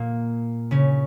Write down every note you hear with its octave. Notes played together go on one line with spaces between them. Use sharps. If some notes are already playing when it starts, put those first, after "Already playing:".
Already playing: A#2 A#3
C#3 C#4